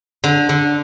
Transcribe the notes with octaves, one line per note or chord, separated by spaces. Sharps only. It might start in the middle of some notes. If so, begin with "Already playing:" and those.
D3
D3